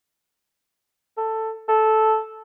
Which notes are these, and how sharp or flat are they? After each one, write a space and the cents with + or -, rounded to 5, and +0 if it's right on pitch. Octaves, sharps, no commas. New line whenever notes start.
A4 +10
A4 -10